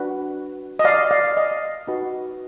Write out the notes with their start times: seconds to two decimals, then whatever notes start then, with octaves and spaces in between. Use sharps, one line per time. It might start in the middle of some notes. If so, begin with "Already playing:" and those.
Already playing: D4 F#4 B4
0.79 D#5
0.84 D5 F5
1.11 D5 F5
1.37 D#5
1.87 D#4 F#4 B4